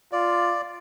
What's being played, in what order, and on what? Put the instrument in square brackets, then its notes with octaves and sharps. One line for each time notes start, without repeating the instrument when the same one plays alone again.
[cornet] F4 [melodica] D5